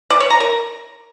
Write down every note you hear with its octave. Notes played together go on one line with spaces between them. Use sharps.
D5
C#5
A#5
A#4